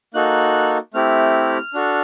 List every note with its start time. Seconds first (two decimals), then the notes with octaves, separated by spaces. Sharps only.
0.14 A#3 D#4 F#4 A4 F#6
0.94 A3 C4 E4 G4 F6
1.74 D4 F#4 A4